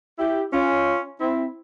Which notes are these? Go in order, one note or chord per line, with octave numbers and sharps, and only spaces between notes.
E4 G4
C#4 F4
C4 E4